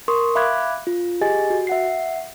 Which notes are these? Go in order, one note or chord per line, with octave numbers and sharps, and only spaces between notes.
A#4 C6 C#6 D#6
E5 F5 B5 D6 F#6 G#6
F4
G4 G#4 D#5 G#5 A6
F#4
E5 F#5 C7